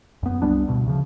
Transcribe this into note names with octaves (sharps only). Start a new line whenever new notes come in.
F#2 B3
C2 G3 B3 D4
D2 G2 B2
D2 C#3 F3